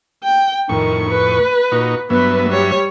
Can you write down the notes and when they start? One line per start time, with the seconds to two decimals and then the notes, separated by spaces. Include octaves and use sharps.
0.24 G5
0.69 F2 A2 D#3 C#6
1.09 B4
1.72 A#2 D#4 F#4
2.10 G2 F#3 B3 B4 E5
2.49 G3 C#5